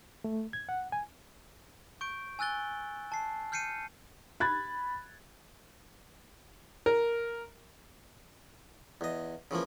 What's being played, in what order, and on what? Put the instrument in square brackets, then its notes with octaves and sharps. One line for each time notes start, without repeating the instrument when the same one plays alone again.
[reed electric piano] A3
G#6
F#5
G#5
[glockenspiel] C#6 G6 D7
G#5 E6 F#6 A6 G7
A5 C7
F6 G6 C7 C#7 D#7
[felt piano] B5 F#6 G#6 A6
[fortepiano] A#4
[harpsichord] E2 D#5
C#3 E3 F3 A#3